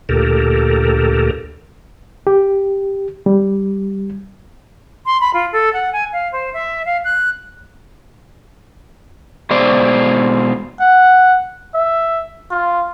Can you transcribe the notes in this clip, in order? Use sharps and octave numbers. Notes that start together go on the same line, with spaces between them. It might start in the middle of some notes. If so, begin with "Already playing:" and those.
D2 A#2 G4 A4 A#4
G4
G3
C6
B5
F4
A4
F#5
G#5
F5
C5
E5
F5
F#6
B2 G#3 C5 D5
F#5
E5
F4